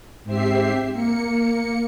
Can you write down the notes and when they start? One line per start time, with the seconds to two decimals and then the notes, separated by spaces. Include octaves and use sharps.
0.24 G#2 C4 G4 E5 C7
0.93 A#3 C#7